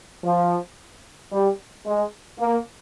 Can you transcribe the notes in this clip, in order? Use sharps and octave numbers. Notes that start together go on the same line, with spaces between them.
F3
G3
G#3
A#3